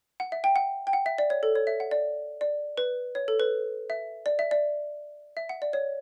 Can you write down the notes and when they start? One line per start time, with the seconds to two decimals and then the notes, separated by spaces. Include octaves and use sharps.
0.20 F#5
0.32 E5
0.44 G5
0.56 F#5
0.87 G5
0.93 F#5
1.06 E5
1.18 D5
1.30 C#5
1.43 A4
1.55 C#5
1.67 E5
1.80 F#5
1.91 D5
2.41 D5
2.77 B4
3.15 C#5
3.28 A4
3.40 B4
3.90 E5
4.26 D5
4.39 E5
4.51 D5
5.37 E5
5.49 F#5
5.62 D5
5.73 C#5